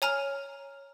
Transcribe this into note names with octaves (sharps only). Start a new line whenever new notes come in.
C#5 G#5 A#5 F6 F7